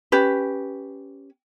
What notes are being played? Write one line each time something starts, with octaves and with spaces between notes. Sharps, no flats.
C#4 G4 B4